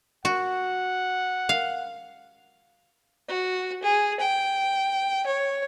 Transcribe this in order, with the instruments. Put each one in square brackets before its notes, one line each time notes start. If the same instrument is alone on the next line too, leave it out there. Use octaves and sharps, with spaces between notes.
[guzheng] F#4 [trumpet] F#5
[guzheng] F5
[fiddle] F#4
G#4
G5
C#5